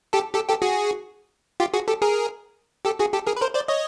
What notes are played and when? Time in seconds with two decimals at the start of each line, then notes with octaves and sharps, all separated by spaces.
0.13 G4 A4
0.34 G4 A4
0.49 G4 A4
0.62 F#4 G#4
1.60 F4 G4
1.74 F#4 G#4
1.88 G4 A4
2.02 G#4 A#4
2.85 G4 A4
2.99 F#4 G#4
3.13 G4 A4
3.27 G#4 A#4
3.36 B4
3.41 A#4 C5
3.55 C5 D5
3.68 C#5 D#5